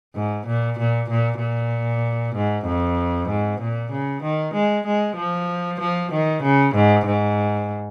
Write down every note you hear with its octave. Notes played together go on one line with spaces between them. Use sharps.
G#2
A#2
A#2
A#2
A#2
G#2
F2
G#2
A#2
C#3
D#3
G#3
G#3
F3
F3
D#3
C#3
G#2
G#2